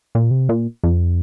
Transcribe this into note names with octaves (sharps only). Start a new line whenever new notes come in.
A#2
C3
A#2
F2